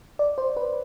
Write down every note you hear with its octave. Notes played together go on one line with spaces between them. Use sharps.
D5
C5
B4